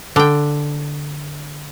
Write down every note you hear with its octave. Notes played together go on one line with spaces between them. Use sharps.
D3 G5